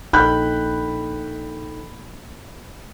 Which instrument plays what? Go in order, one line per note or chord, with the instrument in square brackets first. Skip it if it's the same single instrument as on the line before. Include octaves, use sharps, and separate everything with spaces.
[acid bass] A#1 [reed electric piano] D#4 A4 G5 [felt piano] B5 F#6 G6